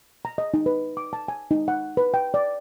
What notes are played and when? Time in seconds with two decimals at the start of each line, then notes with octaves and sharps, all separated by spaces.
0.25 A#5
0.38 D#5
0.54 D#4
0.66 B4
0.97 D6
1.13 A5
1.28 G#5
1.51 D#4
1.68 F#5
1.97 B4
2.14 G5
2.34 D5